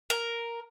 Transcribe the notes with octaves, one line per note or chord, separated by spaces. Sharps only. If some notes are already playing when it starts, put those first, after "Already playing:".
A#4